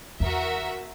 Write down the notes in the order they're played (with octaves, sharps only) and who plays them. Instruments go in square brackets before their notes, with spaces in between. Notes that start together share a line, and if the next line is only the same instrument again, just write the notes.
[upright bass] E2 [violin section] F#4 A#4 E5